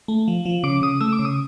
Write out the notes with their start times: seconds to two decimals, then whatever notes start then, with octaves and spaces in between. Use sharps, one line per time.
0.08 A3
0.28 F3
0.45 F3
0.63 C#3 D6
0.82 C#3 D#6
1.00 A3 E6
1.12 D6
1.19 C#3
1.25 D#6